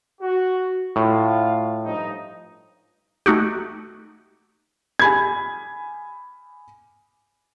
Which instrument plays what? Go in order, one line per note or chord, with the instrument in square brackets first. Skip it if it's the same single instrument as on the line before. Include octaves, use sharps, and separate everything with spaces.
[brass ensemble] F#4
[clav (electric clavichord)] A2 [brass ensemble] F4
[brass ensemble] G2 F3 D#4
[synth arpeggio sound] A3 D#4 F#4 G4
[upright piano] G#5 B5 G#6